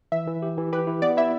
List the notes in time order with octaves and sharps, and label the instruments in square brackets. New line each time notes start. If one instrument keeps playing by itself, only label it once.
[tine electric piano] E3 [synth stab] E5
[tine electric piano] E3
G4
E3
[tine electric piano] G4 [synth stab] B4
[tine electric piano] E4
[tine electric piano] B3 [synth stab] D5
[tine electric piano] E4 [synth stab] E5